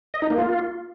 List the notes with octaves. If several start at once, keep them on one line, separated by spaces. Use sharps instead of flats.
D#5
D#4
A#3
F4